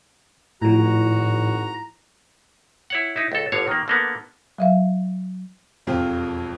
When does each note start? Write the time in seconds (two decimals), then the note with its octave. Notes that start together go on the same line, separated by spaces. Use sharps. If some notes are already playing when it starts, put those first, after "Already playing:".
0.62 G#1 A2 F3 E4 F#4 A#5
2.90 E4 C#5 F#5
3.16 D#4 E4
3.32 C#2 A4
3.52 G1 D3 C#5 F5
3.68 D#3 A#3
3.88 D3 A#3 B3
4.58 F#3 E5 F5
5.87 E1 F2 C4 F4 G4